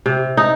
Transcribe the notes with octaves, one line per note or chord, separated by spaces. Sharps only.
C3
D#4